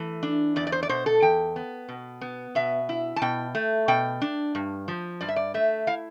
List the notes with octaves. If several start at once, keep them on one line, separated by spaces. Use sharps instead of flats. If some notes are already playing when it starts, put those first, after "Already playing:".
Already playing: E3 A3
D4
E2 D5
D5
C5
D5
B2 C5
A4
E2 G5
B3
B2
B3
B2 E5
E4
A5
B2 G5
A3
B2 G5
D4
G2
F3
G2 D5
E5
D5
A3 E5
E4 F5